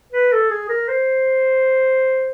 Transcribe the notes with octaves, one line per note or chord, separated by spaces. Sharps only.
B4
A4
G#4
A#4
C5